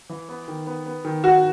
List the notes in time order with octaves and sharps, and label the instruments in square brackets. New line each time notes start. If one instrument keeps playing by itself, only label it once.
[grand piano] E3
B3
D#3
B3
B3
D#3
[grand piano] D#3 [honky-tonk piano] F#4